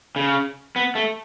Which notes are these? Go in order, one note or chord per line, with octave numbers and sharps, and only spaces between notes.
C#3
B3
A3